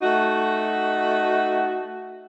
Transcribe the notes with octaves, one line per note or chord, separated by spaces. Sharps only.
A3 D#4 F#4